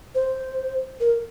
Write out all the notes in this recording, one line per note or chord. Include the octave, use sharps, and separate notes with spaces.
C5
A#4